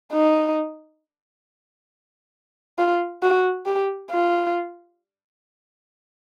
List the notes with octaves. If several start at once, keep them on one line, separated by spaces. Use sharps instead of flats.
D#4
F4
F#4
G4
F4